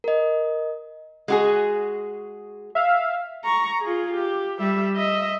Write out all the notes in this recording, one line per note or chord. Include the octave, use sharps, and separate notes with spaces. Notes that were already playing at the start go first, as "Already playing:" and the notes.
A#4 D#5
G#3 F#4 G#4
E5 F5
A#5 C#6
F4 G#4
G4
G3 E5
D#5 E5